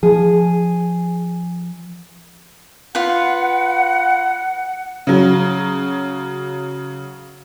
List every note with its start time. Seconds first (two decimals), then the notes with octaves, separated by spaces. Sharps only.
0.03 F3 G#4
2.95 F4 B4 F#5
5.07 C#3 F#3